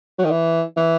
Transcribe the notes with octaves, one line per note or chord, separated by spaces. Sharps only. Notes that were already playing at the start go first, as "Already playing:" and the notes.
F#3
D#3
E3
E3